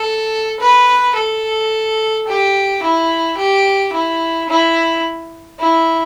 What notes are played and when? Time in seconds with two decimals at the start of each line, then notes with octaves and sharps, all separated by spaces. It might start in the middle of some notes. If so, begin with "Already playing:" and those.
Already playing: A4
0.60 B4
1.16 A4
2.27 G4
2.83 E4
3.37 G4
3.93 E4
4.49 E4
5.59 E4